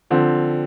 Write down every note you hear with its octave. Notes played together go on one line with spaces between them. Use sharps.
D3 F3 C4